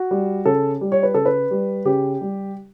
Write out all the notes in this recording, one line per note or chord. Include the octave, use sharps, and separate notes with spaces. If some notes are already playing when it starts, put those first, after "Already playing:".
Already playing: F#4
G3
C#3 A4
G3
C#5
B4
C#3 A4
B4
G3
C#3 G4
G3